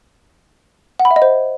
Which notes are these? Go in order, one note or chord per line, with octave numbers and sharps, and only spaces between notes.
F#5
B5
E5
D#5
C5